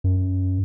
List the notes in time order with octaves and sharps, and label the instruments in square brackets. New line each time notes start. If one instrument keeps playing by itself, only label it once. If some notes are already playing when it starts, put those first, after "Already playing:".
[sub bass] F#2